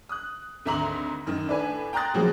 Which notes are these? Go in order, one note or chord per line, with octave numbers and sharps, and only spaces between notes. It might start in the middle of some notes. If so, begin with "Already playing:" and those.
D#6 F#6
G#1 D2 E5 A#5 C6 F#7
F#2 D#3
A2 D4 B4 G#5
G5 A#5 C6 D#6 F#6 A6
C#3 F3 F#3 G#3 A#3